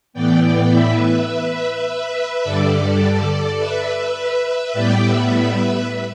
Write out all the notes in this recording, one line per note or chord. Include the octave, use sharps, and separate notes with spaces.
A2 E3 B3 D5 G5
D5 G5
B4 E5
B4 E5
G2 D3 G3 A4 D5
B4 E5
A2 G3 B3 D5 G5
B4 E5